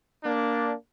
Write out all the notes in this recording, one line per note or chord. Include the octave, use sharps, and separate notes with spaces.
A#3 D4